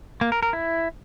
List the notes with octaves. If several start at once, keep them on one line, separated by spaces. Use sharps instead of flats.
A#3
A#4
A#4
E4